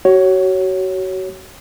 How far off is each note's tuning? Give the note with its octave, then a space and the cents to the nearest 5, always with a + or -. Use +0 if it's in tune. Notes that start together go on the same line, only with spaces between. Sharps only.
F#4 +30 C#5 +0